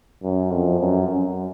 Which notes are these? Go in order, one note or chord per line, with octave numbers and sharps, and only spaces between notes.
F#2
F2
F#2
F#2